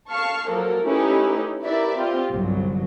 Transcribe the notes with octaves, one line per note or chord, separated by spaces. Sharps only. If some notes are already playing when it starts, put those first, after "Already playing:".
F5 A5 C#6 F6 C7
F3 F#3 A#3 A4 A#4
A3 C#4 D#4 E4 G4 B4
E4 G4 A#4 B4 D5 E5
C4 F4 G4
G1 C2 F#3